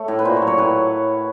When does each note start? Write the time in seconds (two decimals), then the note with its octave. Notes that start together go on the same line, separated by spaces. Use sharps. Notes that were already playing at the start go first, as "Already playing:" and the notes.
Already playing: A3 C#5
0.08 A2
0.19 B4
0.25 A#2 C5
0.36 C#5
0.42 F#3
0.47 C#5
0.58 A2 B4